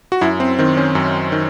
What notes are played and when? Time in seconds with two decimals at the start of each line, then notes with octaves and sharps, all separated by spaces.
0.12 F#4
0.21 F#2 E4
0.40 C4
0.59 D#3 C4
0.77 C#4
0.95 F#2
1.32 D#3